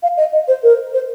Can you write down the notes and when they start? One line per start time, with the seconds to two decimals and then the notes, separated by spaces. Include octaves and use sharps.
0.03 F5
0.17 D#5
0.33 D#5
0.48 C5
0.63 A#4
0.94 C5